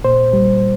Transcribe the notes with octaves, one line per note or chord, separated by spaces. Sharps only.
A#2 C5
G3